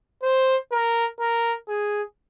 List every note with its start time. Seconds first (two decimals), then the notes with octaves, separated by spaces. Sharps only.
0.23 C5
0.72 A#4
1.20 A#4
1.68 G#4